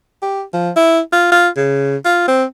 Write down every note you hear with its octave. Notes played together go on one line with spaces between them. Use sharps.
G4
F3
E4
F4
F4
C#3
F4
C4